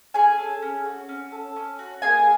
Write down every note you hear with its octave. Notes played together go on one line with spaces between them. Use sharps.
C#4 G#4 G#5
A4
C#4
F#4
C#4
A4
C#4
F#4
A#3 G#4 G#5